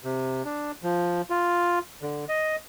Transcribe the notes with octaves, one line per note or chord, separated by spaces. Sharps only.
C3
D4
F3
F4
D3
D#5